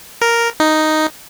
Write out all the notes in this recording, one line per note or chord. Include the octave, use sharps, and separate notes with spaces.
A#4
D#4